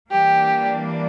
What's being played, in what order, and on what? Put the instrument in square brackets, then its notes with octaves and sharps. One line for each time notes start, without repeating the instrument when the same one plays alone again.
[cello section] E3 G3 A#3 D4 [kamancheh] G4